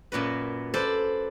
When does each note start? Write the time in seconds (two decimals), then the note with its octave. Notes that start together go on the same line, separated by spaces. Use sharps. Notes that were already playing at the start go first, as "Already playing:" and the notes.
0.12 F#2 A#2 F#4 B4
0.74 A4 B4 C5 D5